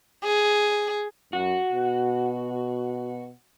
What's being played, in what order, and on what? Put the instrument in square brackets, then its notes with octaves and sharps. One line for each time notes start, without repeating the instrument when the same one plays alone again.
[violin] G#4
[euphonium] F#2 [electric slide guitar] F#4
[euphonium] B2